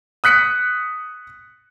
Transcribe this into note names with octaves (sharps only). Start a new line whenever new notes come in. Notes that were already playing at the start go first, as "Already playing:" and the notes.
D#6 F#6 B6 C#7